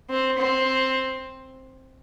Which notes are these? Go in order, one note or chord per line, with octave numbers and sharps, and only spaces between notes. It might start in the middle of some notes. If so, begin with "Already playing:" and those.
C4
C4